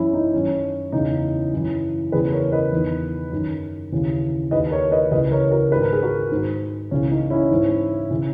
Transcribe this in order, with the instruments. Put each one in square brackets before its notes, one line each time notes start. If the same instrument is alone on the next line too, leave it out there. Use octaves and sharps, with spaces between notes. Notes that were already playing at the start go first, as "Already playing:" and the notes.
Already playing: [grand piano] F#2 E3 C#4 E4
D#4
F#2 D#3 C#4
E2 C#3 E3 D#4
F#2 E3
E2 C#3 E3 G#4 B4
A#4 C#5
B4 D#5
E2 D#3
F#2 D#3
D#2 C#3 E3
D#2 D#3 B4 D#5
A#4 C#5
B4 D#5
C#2 C#3 E3 B4 D#5
A#4 C#5
F#4 A#4
G#2 D#3 B4
A#4
G#4
F#4 A#4
G#2 D#3
C#2 C#3 E3 C#4
D#4
C#4 E4
G#2 E3
C#3 E3